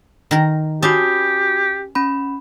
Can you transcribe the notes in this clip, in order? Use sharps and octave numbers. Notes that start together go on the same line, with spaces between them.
D#3 A#4
C#4 F#4 G4 A5 D6 D#6
C#4 B5